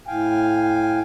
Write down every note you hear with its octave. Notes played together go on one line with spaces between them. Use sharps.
A2 F5 G5 G#5